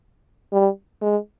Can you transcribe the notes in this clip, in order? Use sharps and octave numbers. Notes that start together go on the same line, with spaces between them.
G3
G#3